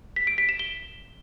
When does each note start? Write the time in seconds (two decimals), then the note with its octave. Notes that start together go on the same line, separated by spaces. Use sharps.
0.16 B6
0.27 D7
0.38 B6
0.49 E7
0.59 G7